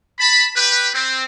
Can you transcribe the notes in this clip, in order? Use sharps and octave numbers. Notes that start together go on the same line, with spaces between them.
A5 B5
G4 B4
C4